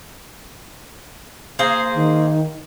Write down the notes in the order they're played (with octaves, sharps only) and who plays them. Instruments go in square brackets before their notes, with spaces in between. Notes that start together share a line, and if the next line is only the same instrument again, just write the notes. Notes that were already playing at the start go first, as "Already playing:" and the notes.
[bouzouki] A#3 G#4 C5
[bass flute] D#3